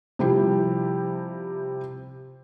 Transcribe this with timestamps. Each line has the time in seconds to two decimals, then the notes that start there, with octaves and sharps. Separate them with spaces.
0.19 C3 F3 G3 E4 G4